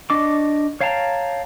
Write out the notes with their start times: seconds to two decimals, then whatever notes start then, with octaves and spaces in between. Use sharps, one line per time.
0.10 D4 D#5 C#6 D6
0.81 C#5 F5 G5 A5 A#5